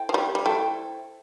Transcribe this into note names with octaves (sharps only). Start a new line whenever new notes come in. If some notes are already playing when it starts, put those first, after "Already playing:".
Already playing: E4 A4 C5 G5
F3
G3
G3
A3 E4 A4 C5 G5